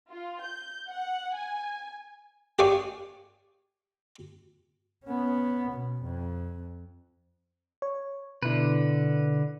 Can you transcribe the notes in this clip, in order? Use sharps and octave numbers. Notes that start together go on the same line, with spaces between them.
F4
G6
F#5
G#5
G4 G#4 D5 F5 C#6 D#6
B3 C#4
B2
F2
C#5
B2 D3 E4 B4